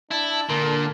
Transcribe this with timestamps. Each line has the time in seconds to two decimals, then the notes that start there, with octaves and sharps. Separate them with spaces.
0.11 D4 E4 A5
0.49 A#2 D3 A#4